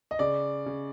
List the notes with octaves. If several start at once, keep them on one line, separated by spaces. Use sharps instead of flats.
D#5
C#3 D5
C#3